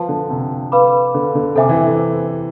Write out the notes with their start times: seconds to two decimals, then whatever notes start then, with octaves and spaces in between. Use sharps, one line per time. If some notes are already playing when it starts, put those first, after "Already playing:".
Already playing: F3 B4 F5 A5
0.08 D3
0.30 C3
0.72 B4 F5 B5 D6
1.14 D3
1.35 D3
1.56 C3 A4 C5 E5 G#5 D6
1.69 E3